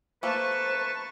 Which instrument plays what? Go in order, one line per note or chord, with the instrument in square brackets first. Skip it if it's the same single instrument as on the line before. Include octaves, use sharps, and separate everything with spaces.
[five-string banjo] A3 A#3 [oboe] B4 [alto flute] C5 [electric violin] A5 C#6